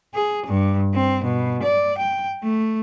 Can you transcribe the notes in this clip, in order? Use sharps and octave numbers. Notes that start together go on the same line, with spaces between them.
G#4
G2
C4
B2
D5
G5
A3